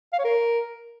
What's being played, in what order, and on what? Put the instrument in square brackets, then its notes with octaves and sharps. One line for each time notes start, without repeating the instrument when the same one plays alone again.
[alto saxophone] F5
C#5
A#4